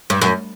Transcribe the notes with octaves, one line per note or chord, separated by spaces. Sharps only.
G2
F#2